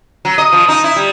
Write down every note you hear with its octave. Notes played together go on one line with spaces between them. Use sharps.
F#3
D#5
F3
D#4
E4
G3